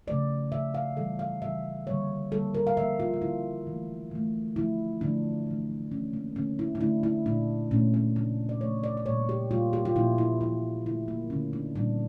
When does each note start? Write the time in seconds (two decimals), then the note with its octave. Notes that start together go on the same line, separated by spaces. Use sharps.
0.07 C#3 F3 A3 D5
0.52 C#3 F3 A3 E5
0.74 F5
0.97 C#3 E3 G3 A4
1.19 F5
1.42 C#3 E3 G3 E5
1.87 D3 G3 A#3 C#5
2.32 D3 G3 A#3 A4
2.55 A#4
2.67 F5
2.77 D3 F3 A#3 E5
3.00 F4
3.14 F4
3.21 D3 F3 A#3 E4
3.67 E3 A3
4.11 E3 A3
4.56 D3 F3 A3 E4
5.01 D3 F3 A3 D4
5.46 E3 A3
5.91 E3 A3 C#4
6.13 A#3
6.36 D3 A3 C#4
6.59 E4
6.75 D4
6.81 D3 A3 E4
7.03 E4
7.26 A#2 A3 D4
7.71 A#2 A3 C#4
7.94 C#4
8.16 C#3 F3 A3 D4
8.49 D5
8.61 C#3 F3 A3 C#5
8.84 D5
8.97 D5
9.06 A#2 G3 A#3 C#5
9.29 G4
9.51 A#2 G3 A#3 F4
9.73 G4
9.85 F4
9.96 A#2 F3 A#3 E4
10.18 E4
10.41 A#2 F3 A#3 E4
10.86 D3 A3 E4
11.08 A#3
11.30 D3 A3 C#4
11.53 D4
11.76 A#2 G3 A#3 D4